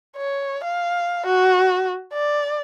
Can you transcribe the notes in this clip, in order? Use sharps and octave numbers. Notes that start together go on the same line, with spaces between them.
C#5
F5
F#4
D5